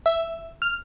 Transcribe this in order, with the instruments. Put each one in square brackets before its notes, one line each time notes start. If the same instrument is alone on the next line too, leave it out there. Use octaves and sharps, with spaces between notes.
[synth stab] E5
F6